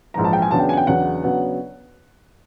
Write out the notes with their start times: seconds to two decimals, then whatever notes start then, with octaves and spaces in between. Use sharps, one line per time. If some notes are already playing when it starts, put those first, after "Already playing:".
0.14 A#1 G#2 E3 A#5
0.24 A5
0.33 G5
0.42 G#5
0.51 E2 C#3 F#3 B3 D4 A5
0.59 G5
0.69 G#5
0.73 F#5
0.77 G5
0.87 E2 C#3 F#3 B3 D4 F#5
1.23 C#3 F#3 B3 D4